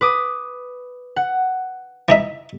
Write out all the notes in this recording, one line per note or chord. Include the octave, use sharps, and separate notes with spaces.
B4 D6 D#6
F#5
E3 D#4 E5